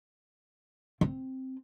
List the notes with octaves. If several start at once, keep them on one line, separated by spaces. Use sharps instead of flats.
C4